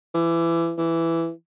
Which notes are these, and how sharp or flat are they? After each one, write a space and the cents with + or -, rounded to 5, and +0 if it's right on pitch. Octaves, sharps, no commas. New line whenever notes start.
E3 +25
E3 +10